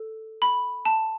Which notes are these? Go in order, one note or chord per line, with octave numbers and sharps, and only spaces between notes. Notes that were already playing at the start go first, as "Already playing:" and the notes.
Already playing: A4
B5
A5